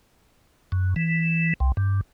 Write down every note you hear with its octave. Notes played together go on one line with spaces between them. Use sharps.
F#2
E3
C2
G2